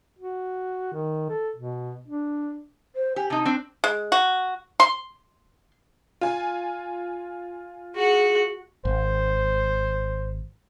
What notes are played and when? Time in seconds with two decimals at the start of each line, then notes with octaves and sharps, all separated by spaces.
0.19 F#4
0.93 D#3
1.29 A4
1.56 B2
2.08 D4
2.96 C5
3.16 G4 G#5
3.30 C3 D#4 A5
3.45 C4 D4
3.84 G#3
4.12 F#4
4.80 C6
6.21 F4 G#5
7.96 F#4 G#4 F#5
8.85 G#1 C5